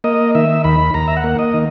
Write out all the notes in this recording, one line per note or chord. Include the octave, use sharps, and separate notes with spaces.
A#3 D#5
D#3 E5
D#2 B5
D#2 A#5
E5
F#5
A#3
D#5
D#3